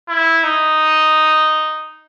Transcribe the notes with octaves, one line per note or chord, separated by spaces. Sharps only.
E4
D#4